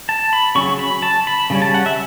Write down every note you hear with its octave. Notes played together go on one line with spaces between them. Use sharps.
A5
B5
C#3 F#3 C#4 C#6
B5
A5
B5
C#3 G3 C#4
A5
F#5
E5